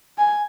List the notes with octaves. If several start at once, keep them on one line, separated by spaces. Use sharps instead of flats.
G#5